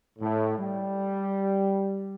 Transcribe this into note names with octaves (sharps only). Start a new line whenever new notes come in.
A2
G3